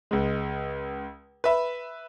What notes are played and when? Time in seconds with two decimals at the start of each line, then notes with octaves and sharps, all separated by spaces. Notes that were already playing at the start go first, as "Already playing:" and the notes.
0.11 C#2 G#3
1.44 B4 E5